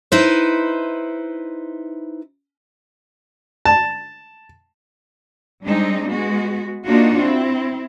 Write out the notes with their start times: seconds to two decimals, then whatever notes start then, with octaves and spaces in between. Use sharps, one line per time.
0.12 D#4 E4 B4 C5
3.65 A5
5.64 G3 G#3 C4 D4 D#4
6.10 G#3 B3 F#4
6.86 A#3 D4 D#4 F4 F#4
7.23 C4 E4